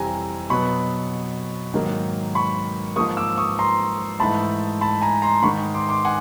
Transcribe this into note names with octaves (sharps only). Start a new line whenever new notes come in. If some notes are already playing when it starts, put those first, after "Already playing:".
Already playing: F2 C3 E3 G3 C4 G#5 A#5
B2 F#3 B3 B5 C#6
G#2 D#3 F#3 A#3
B5 C#6
G#2 F3 A#3 C#6 D#6
D6 E6
C#6 D#6
A#5 C6
G#2 E3 A3 A5 B5
A5 B5
G#5 A#5
A#5 C6
G#2 D#3 G#3 B5 C#6
C6 D6
C6 D6
F#5 G#5